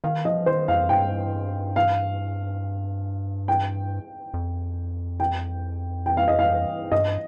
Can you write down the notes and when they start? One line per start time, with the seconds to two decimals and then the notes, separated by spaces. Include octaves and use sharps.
0.04 D#3 F5
0.25 F3 D#5
0.46 D#3 C5
0.68 F2 F5
0.89 G2 G5
1.76 F5
3.48 G5
4.34 F2
5.20 G5
6.06 G5
6.17 F5
6.28 D#5
6.39 F5
6.92 G2 D#5